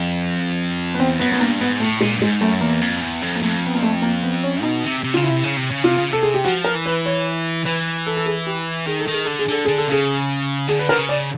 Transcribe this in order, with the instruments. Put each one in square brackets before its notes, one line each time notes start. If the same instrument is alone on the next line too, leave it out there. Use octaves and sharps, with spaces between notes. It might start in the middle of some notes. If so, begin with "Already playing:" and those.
Already playing: [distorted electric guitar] F2
[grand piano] B3
[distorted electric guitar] E2 [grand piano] C4
[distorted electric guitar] F#2 [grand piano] B3
[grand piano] B3
[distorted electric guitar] G2 [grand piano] A#3
[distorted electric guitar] G#2 [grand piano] B3
[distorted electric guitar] A2 [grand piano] A3
[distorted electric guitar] A#2 [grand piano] G#3
[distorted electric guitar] G2
[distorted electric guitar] G#2 [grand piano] G#3
[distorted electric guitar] F#2 [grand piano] A3
[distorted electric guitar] E2 [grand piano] A#3
[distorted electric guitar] F2
E2
F2
[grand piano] A#3
[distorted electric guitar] F2 [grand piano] A3
[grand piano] B3
A#3
A3
A#3
B3
C#4
[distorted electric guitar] B2 [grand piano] D#4
[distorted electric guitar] C3
C3
[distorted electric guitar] C#3 [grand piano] F4
[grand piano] E4
[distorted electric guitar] C3
C#3
C3
C#3
[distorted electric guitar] C3 [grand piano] F4
[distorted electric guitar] C#3
[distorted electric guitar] C3 [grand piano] A4
[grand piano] G#4
G4
[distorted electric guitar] F3 [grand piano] F#4
[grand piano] A#4
[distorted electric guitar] E3
[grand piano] B4
C#5
[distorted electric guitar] E3 [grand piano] B4
[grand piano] A4
A4
G#4
G4
[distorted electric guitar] D#3 [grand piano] G#4
[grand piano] A4
[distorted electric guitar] D#3
[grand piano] G#4
[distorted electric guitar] D3 [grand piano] A4
[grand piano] G#4
[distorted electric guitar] D3 [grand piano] A4
[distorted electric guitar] D3 [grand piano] G#4
[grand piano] A4
[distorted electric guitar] C#3 [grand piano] G#4
[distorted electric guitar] D3 [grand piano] G#4
[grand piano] B4
[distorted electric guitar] D3 [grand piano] A#4
[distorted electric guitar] C#3
[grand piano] D5